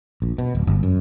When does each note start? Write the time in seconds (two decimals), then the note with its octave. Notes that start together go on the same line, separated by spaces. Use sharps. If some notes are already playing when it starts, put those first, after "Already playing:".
0.22 A#1
0.38 B2
0.55 D1
0.67 G1
0.83 F#2